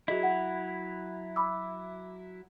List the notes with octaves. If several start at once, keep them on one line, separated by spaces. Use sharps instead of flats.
F#3 E4 F#4 G#4 D#5
F#5
B5 D6 E6